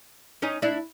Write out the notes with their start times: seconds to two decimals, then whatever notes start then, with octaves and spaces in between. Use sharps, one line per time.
0.42 C#4 D#4
0.62 D4 E4